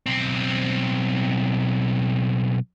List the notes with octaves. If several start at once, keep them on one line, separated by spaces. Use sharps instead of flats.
B1 C4